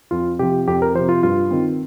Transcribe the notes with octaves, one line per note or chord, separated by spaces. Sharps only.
F2 F4
C3 F3 G4
F2 G4
A#4
C3 F3 C5
F4
G2 F4
D#3 C4